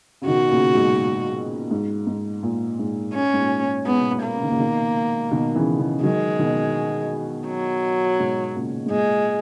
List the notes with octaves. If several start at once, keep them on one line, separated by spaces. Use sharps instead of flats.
C#3
B2 D#3 F#4
A#2 C#3
G#2 B2
G#2
G#2
A#2
G#2
C#4
G#2
A#2
G#2
G#2 B3
B2
A#2
A#3
C#3
D#3
A#2 C#3
B2 D#3
B2 D#3
C#3 E3
C#3 E3
D#3 F#3 G#3
B2 D#3
F#3
G#2 B2
A#2 C#3
G#2
A#2 G#3